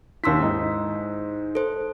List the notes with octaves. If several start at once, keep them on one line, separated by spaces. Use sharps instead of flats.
D#2 E4 C6 E6 B6
G#2 D#4
A4 C5